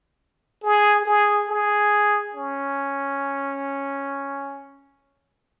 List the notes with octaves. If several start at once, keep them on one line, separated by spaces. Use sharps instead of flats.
G#4
G#4
G#4
C#4